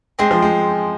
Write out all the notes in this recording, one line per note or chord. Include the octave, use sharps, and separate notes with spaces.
G#3 C4 G#4 C5
F3
G#3